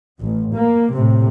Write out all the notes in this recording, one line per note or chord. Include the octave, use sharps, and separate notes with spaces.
A1
A#3
A2 C3